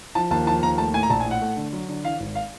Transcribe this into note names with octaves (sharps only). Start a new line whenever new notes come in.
F3 A5
D#2 A5
F3 A5
D#2 A#5
A3 A5
A2 G#5
A#5
A#1 A5
G#5
A2
F#5
A3
D3
F#3
D3
E3 F5
G#1
F5